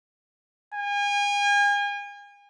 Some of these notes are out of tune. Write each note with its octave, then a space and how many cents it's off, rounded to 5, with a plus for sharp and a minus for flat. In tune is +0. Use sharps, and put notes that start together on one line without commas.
G#5 -35